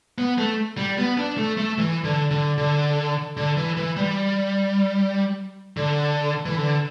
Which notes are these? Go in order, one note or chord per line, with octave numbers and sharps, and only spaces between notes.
B3
A3
G3
B3
D4
A3
A3
E3
D3
D3
D3
D3
E3
E3
G3
D3
E3
D3